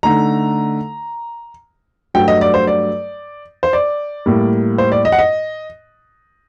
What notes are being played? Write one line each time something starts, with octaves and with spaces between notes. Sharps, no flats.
D3 A3 D#4 A#5
G2 F#3 A3 G5
D#5
D5
C5
D5
C5
D5
A2 G3 A#3
C5
D5
D#5
F#5
D#5